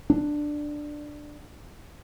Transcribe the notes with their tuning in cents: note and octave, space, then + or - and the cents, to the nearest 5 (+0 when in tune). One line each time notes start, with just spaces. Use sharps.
D4 +10